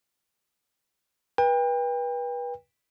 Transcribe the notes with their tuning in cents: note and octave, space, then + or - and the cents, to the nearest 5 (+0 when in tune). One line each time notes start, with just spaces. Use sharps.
B4 -30 G5 +35